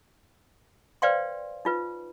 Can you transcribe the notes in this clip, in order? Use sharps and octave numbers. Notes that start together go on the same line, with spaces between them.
B4 C5 D5 F5 G5 C6
D#4 F4 B4